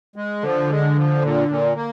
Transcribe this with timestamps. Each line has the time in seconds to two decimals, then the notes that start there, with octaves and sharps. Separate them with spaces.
0.16 G#3
0.43 D3 F3
0.70 G#3
0.96 F3
1.22 A#2
1.49 A#2
1.75 A#3